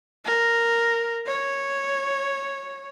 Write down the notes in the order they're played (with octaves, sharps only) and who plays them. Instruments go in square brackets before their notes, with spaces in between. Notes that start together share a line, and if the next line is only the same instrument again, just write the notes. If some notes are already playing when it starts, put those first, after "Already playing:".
[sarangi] A#4
C#5